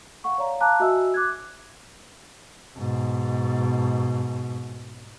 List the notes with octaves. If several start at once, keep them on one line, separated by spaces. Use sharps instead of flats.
F5 F#5 C#6
C#5 D5 F5 A#5
F5 A5 A#5 D6 F#6
F#4 D#5 E5 G#5 E6
D6 F#6 G#6
G#2 B2